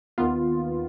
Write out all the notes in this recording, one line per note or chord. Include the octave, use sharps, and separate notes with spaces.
D#2 D#3 B3 F4